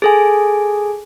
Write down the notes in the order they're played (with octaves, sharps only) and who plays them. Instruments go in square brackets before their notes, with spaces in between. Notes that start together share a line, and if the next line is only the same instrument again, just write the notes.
[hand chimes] G#4 A4 G#5